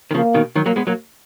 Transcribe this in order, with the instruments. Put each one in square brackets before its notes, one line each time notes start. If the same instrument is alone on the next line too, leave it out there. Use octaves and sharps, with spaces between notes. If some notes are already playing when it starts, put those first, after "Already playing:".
[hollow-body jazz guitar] D#3
[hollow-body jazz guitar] C#3 F3 [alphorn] A#3
[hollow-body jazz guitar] B2 D#3
D#3 F#3
F#3 A#3
G#3 B3
F#3 A#3